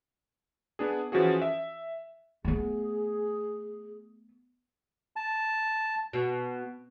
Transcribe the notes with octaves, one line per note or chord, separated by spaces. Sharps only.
B3 D4 G#4
E3 F3 C#4 F#4 G#4
E5
A3 B3 G#4
A5
B2